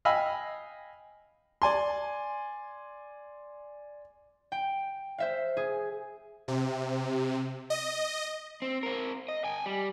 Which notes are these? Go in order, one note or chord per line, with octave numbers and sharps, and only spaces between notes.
D#5 F5 G5 G#5 B5 E6
D5 G#5 C6
G5
C5 E5 F5
G#4
C3
D#5
C4
C4 A#4
D#5
G5 G#5
G3